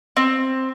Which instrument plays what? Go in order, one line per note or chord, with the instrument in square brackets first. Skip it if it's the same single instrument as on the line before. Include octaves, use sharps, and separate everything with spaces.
[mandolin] C4